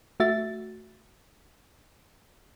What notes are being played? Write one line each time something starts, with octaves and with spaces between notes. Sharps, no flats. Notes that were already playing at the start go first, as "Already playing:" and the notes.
A3 F#4 E5 A6